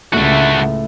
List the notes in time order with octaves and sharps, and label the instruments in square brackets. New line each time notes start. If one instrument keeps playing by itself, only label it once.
[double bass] C#2 [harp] A2 [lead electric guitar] A3 F#4